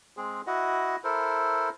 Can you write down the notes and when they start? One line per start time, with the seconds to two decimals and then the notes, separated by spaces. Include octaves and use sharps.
0.17 G#3 C4 G#4
0.47 E4 F#4 D#5 F#5
1.04 E4 A4 A#4 C5